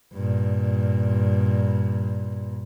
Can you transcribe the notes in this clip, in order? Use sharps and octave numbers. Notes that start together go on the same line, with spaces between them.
G2 A#2